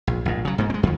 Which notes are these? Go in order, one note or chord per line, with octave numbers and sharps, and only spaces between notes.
A#1
A#1 G#2
C#3 F#3
G#2 A#3
G#3 C4
F2 D#3